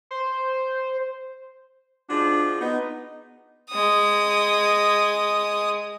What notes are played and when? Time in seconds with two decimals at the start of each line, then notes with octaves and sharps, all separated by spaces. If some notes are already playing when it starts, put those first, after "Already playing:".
0.11 C5
2.10 F3 G#3 D4 F#4
2.61 B3 D#4
3.70 G#3 D#6